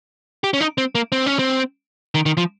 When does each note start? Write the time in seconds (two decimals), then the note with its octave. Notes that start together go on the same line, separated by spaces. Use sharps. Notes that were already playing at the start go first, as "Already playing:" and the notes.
0.44 G4
0.54 C#4
0.60 D#4
0.78 C4
0.95 A#3
1.12 C4
1.26 C#4
1.39 C4
2.15 D#3
2.26 D#3
2.37 F3